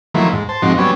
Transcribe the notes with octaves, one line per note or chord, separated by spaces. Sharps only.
D#3 F3 F#3 A3 A#3 E4
G#2
C5 A5
G#2 F3 C4 D#4 F#4
F#3 G3 B3 C#4